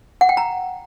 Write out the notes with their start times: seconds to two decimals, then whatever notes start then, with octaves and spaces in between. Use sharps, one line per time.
0.21 F#5
0.29 G5
0.37 A#5